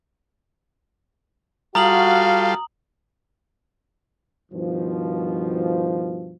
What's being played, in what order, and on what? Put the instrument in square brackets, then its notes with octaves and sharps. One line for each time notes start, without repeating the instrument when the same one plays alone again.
[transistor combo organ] G3 F4 A4 [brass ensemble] F#4 [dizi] F5 [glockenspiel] A#5 D#6 F#7
[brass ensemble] G2 B2 D#3 F3